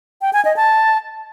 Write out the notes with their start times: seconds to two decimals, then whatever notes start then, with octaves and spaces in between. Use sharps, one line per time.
0.22 G5
0.33 G#5
0.45 D#5
0.57 A5